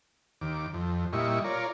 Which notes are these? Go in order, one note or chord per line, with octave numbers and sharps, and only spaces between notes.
D#2 D6
F2
A#2 G3 E4 D#5 C#6
F4 A#4 C#5 D5